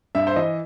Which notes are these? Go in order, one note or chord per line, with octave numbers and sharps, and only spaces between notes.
G2 E5
C5
E3 D#5